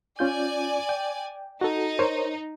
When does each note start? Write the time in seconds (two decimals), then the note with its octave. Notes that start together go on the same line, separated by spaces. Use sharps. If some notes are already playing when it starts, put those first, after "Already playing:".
0.19 C#4 F4 D5 G#5 G6
0.89 G5
1.61 D#4 F#4 A4
1.99 A#4 C5 C#5